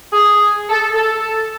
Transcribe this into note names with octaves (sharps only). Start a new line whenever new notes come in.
G#4
A4
A4